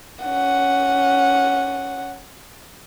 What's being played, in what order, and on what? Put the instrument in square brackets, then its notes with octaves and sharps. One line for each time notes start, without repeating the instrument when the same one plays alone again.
[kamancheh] C#4 F#5